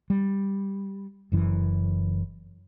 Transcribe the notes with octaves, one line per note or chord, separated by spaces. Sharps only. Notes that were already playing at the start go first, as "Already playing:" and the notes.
G3
F#1 F#2 E3